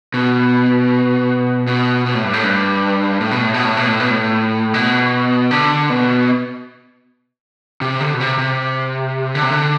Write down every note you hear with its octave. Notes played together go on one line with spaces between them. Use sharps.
B2
B2
B2
A2
G2
A2
G2
A2
B2
A2
B2
A2
B2
A2
B2
A2
B2
D3
B2
C3
D3
B2
C3
C3
D3
C3
D3